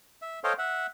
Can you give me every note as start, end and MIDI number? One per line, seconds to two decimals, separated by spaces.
0.22 0.40 76
0.44 0.53 69
0.44 0.53 72
0.44 0.53 73
0.44 0.53 75
0.44 0.53 77
0.44 0.53 79
0.58 0.87 76
0.58 0.87 78